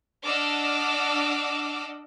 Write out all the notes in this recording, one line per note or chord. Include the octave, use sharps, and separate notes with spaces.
D4 D#5 F#5 D6 E6 F6